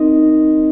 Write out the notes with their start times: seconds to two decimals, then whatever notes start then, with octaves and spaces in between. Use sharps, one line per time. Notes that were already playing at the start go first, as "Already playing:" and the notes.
Already playing: C4 D#4 A#4 D#5